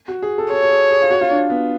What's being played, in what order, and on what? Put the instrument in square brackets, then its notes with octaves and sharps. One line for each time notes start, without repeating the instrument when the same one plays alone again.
[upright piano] F#4
G#4
A4
[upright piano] A4 [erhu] C#5
[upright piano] A4
G#4
G#4
F4
F#4
F4
D4
B3